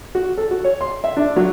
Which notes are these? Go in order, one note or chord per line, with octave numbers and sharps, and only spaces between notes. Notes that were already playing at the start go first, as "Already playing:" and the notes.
F#4
A4
F#4
C#5
C6
E5
D4
F#3